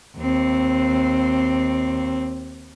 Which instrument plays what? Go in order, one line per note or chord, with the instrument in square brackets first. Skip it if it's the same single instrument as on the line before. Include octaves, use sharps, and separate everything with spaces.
[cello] D#2 C4